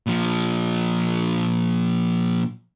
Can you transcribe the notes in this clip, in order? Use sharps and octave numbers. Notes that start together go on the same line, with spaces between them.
A#2 F3